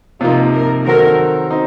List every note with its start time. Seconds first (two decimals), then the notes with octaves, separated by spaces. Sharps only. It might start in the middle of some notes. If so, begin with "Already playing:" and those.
0.20 C3 F3 A#3 D#4 F4
0.53 A#4
0.85 D#3 F#3 C4 F#4 A4 A#4
1.51 C4 D#4